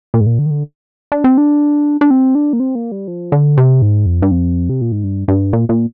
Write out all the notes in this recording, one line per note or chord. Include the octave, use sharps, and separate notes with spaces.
A#2
G#2
A#2
D3
D#3
D3
D4
C4
D4
D4
C4
D4
A#3
C4
A#3
G3
F3
D3
C3
G#2
F2
G2
F2
C3
A#2
G#2
G2
G2
A#2
A#2